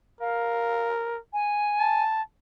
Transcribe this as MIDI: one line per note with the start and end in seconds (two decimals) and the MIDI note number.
0.21 1.19 70
0.21 0.88 77
1.33 2.04 80
1.80 2.22 81